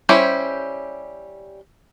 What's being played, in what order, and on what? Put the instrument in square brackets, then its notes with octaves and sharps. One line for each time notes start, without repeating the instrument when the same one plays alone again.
[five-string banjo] G3 C#4 E4 G4 C5